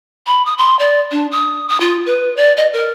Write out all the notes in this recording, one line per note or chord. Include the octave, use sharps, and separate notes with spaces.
B5
D#6
C6
D5
D4
D#6
D#6
F4
B4
D5
D#5
A#4